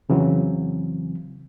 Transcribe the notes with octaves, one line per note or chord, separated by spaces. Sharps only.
F2 C#3 E3 F#3 C4